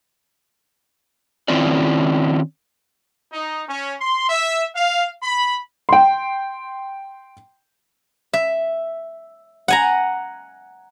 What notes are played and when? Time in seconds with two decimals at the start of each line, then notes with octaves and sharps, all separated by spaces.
1.48 D#3 C4 C#4 E4 F4 D5
3.33 D#4
3.68 C#4
3.99 C6
4.29 E5
4.75 F5
5.22 B5
5.89 G5 C6
8.33 E5
9.68 F#5 G#5 A#5